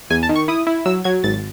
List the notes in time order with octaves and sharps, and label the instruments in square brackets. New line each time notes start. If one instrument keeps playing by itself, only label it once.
[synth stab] E2 G#5
A5
D#3
C#6
E4 D#6
E4
F#3 E6
F#3 G#6
G#1 A6